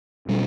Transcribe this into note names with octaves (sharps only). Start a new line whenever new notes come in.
B2 G3 D4